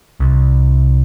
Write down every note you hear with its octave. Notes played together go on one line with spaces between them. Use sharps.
C2